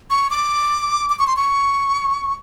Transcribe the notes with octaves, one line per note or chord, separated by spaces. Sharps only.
C#6
D6
D6
C#6
C6
C#6